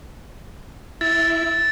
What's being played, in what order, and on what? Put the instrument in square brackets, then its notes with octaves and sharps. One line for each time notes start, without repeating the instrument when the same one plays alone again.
[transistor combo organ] E4 [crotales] A6